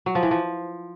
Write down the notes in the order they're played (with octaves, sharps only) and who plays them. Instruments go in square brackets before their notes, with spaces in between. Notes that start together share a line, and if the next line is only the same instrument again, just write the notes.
[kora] F#3
F3
E3
F3